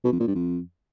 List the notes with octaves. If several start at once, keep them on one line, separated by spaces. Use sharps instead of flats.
B2
F2
A#2
G2
F2